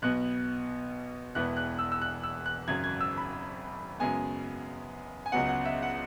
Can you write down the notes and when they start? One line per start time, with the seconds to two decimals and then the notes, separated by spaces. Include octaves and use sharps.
0.02 B1 B2 B3 F#6
1.35 E1 E2 E3 B3 F#6
1.57 F#6
1.79 E6
1.92 E6
2.02 F#6
2.23 E6
2.46 F#6
2.68 G#1 F#2 C#3 G#6
2.84 G#6
3.01 E6
3.17 B5
4.00 F#2 C#3 G#3 B3 G#5
5.26 G#5
5.32 C#2 C#3 F#3 B3 F#5
5.49 F#5
5.65 E5
5.82 F#5